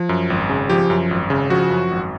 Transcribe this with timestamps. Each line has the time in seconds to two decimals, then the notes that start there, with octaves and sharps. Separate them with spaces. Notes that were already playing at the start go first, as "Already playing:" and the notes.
Already playing: F3
0.09 F#2
0.30 G#1
0.49 C#3
0.69 F3 G4
0.90 F#2
1.11 G#1
1.30 C#3
1.50 F3 F#4
1.70 F#2
1.91 G#1